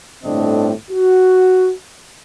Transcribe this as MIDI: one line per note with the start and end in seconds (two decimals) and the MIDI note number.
0.24 0.71 31
0.24 0.71 45
0.24 0.71 50
0.24 0.71 60
0.24 0.71 62
0.24 0.71 75
0.91 1.71 66